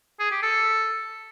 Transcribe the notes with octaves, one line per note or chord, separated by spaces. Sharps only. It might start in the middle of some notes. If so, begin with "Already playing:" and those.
G#4
G4
A4